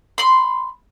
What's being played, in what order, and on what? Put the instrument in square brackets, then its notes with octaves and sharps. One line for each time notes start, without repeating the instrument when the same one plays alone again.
[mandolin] B5 C6